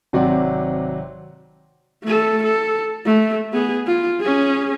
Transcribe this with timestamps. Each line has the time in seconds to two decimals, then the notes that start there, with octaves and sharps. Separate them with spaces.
0.13 G#1 C3 F#3 C4 D5 F#5
2.04 A3 A4
2.43 A4
3.06 A3
3.53 B3 G#4
3.87 F4
4.21 C#4 G#4